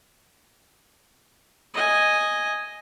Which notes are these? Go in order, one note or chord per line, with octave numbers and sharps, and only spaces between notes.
D#5 G#5